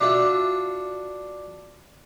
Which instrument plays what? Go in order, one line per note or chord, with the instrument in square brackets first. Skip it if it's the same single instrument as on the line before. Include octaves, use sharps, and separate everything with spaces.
[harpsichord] D4 F4 F#4 E5